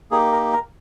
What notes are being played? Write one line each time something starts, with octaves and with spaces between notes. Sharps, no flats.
A#3 D#4 G4 G#4
A#4
A#4